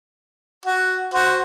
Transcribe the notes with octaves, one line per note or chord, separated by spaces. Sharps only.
F#4
F#4 C5